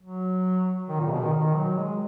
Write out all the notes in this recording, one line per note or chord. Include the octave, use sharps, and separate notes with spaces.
F#3
D#3
A#2
C#3
B2
D#3
D#3
F#3
G#3